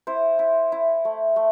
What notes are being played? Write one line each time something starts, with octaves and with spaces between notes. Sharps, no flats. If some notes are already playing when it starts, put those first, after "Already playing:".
E4 C5
E4
E4
A3
A3